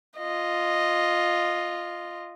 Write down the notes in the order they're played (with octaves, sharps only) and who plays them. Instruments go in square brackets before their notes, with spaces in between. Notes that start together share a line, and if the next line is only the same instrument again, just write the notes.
[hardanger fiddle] F4 D#5